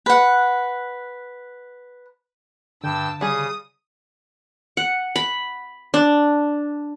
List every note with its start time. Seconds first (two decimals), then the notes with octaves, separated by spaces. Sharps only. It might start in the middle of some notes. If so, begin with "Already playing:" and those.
0.06 B4 F#5
2.84 G2 D3 G5 A5 E6
3.21 C#3 G3 G#4 D#6
4.77 F#5
5.16 B5
5.94 D4